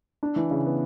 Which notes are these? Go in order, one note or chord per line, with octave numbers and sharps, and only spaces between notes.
D4
E3
C#3
B3